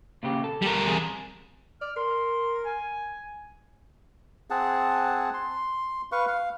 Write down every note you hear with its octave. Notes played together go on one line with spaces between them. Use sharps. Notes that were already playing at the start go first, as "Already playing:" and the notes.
A#2 C#3 G4
A4
G3 A#4
E2 C3 G#4
D5 F6
A#4 C6
G#5
C4 G#4 F#5 A5
C6
B4 F5 C#6
F5